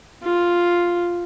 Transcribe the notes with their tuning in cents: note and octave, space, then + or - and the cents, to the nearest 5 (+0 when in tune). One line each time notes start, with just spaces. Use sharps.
F4 +0